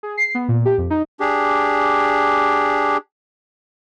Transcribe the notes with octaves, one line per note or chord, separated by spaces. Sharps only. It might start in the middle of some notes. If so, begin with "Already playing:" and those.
G#4
C7
B3
A#2
G4
F2
D#4
D4 G4 G#4